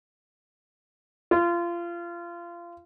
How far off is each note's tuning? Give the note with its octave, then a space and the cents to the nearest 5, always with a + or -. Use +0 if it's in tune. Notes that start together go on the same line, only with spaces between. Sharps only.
F4 -25